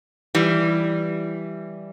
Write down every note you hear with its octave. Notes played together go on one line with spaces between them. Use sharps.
E3 G3